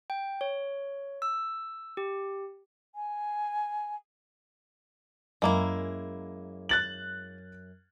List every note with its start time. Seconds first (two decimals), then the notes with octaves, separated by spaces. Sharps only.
0.10 G5
0.41 C#5
1.22 E6
1.97 G4
2.95 G#5
5.42 F#2 G#3 A#3 E4
6.69 F#6 A6 F#7